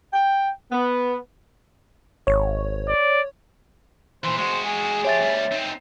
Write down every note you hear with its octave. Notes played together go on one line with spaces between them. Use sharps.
G5
B3
G#1 C#5
D5
A#2 E3 C5
G#3 F#4 C5
G#4
F3 G4 C#5 E5 A6
D2 G3
C4 D#4